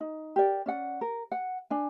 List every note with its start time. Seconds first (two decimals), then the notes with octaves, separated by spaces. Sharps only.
0.01 D#4
0.36 G4 A#4 D5
0.66 C#4 D5 F#5
1.01 A#4
1.32 F#5
1.70 D4 G#5